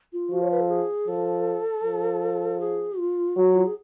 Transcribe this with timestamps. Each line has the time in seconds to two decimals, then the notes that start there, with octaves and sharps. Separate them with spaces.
0.13 F4
0.31 F3 F#4
0.42 C#5
0.51 B4
0.60 A4
0.70 G#4
1.08 F3 A4
1.84 F3
2.60 G#4
2.98 F4
3.36 F#3 F#4
3.55 F4
3.66 G#4